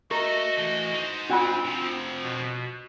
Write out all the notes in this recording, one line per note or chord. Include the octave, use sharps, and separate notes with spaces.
F#4 G4 A4 A#4 D#5 E5
E3 A3
D#4 C5
C4 D4 F4 F#4 F#5 G#5
C3 F3
B2